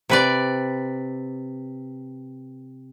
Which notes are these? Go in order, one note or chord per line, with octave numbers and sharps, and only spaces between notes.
C3 B4 D5